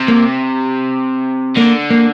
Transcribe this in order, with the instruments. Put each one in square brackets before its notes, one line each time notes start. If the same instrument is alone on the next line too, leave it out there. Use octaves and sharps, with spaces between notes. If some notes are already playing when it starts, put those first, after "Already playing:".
Already playing: [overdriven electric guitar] C3
[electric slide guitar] A#3
[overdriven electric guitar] D3 [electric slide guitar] A#3
[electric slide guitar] A#3